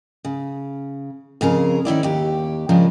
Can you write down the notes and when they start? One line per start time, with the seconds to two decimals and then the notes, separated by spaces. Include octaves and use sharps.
0.25 C#3
1.41 F2 C#3 G#4 A#4
1.85 D#3 C#4 E4 D5
2.03 D#2 G4
2.69 C#3 F3 G#3 D4 A#4